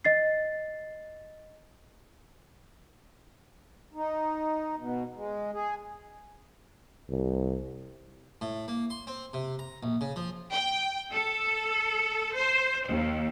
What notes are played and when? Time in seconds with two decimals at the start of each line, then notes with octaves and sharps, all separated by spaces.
0.05 D#5 A6 C7
3.94 D#4
4.77 B2
5.15 G#3
5.53 G#4
7.09 C2
8.41 A2
8.68 A#3
8.90 C6
9.07 C4
9.33 C3
9.59 A#5
9.83 A#1
10.01 C#3
10.16 F3
10.51 G5
11.12 A4
12.35 C5
12.88 D#2